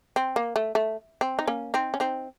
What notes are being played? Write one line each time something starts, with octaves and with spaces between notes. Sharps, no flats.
C4
A#3
A3
A3
C4
D#4
A#3 C#4
C4 D#4
C#4
C4 D#4